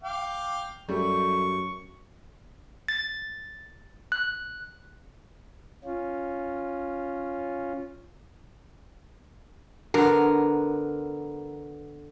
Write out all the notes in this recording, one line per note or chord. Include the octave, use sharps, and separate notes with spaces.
F5 G5 D6
F#2 G3 A3 C#6
A6
F#6
C#4 F4
D3 B3 A#4